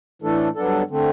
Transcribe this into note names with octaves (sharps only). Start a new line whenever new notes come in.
A2 E3 A3 D4 A4
G2 F#3 B3 D4 A4
D3 A3 C4